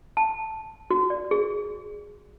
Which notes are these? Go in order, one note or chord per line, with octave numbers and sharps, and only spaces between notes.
A5
F#4
D5
G#4